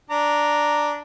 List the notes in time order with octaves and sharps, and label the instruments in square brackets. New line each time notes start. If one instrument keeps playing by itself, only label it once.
[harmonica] D4 A#5